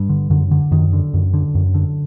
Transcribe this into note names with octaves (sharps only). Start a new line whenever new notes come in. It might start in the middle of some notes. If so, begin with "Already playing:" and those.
Already playing: G2
D3
F#2 D3
D3
F#2 D#3
D3
F#2
D3
F#2
D3